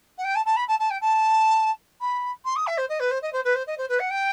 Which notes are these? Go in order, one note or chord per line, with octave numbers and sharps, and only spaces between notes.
F#5
G5
A5
A5
B5
A5
A5
G5
A5
B5
C6
D#6
E5
C5
D#5
B4
C5
D#5
C5
B4
C5
D#5
C5
B4
F#5
G5